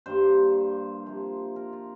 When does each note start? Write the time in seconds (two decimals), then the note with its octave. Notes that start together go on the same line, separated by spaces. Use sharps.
0.06 G2 G3 A#3 C5
1.06 C3 F3 A#3
1.56 A#4
1.73 F4